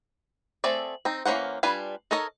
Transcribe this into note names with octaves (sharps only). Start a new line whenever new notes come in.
A3 C4 G#4 A4 D5
C4 D#4
E3 A#3 C#4 C5 F#5
G3 D4 F4 B4 G#5
D#4 A4 A#4 C#5 D#5